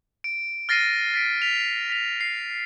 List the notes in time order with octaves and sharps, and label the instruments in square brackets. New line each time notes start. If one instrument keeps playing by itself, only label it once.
[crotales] D7
F6 A6 A#6 C7 D7 D#7
A6 B6 D7
B6 F7
B6 F7
C7